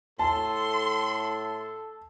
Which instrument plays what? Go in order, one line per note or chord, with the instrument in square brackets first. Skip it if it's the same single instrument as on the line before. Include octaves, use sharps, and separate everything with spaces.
[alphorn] A2 [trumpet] A4 [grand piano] A5 [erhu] C6